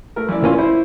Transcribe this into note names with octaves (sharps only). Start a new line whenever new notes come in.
A3 A#4
A1 E4 D5
A#3 C#4 F4
E4 C5